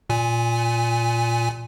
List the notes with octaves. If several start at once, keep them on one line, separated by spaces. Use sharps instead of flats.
A#2 G#5